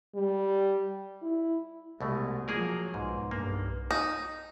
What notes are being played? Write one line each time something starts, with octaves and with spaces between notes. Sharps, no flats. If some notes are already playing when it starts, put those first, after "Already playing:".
G3
E4
C2 B2 G#3 A3
F3 F#3 A#3 G#4 A#4
B1 G#2
B1 G2 A#3
D#4